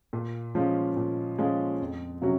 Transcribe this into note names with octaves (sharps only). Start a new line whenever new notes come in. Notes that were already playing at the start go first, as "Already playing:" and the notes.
A#2
F3 G#3 C#4 F4
A#2
F3 G#3 C#4 F4
F2
C3 F#3 C#4 F#4